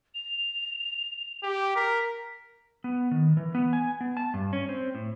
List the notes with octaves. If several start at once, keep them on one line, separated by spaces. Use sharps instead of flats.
F7
G4
A#4 B6
B3
D#3
E3
B3
G#5
B3
A5
G2
C#4
C4
A2